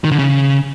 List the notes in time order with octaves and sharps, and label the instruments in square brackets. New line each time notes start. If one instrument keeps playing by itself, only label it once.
[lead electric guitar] D#3
D3
C#3